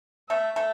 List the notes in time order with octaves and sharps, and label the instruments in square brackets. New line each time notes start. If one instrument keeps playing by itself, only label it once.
[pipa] A3 A4 [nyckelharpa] E5
[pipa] A3 A4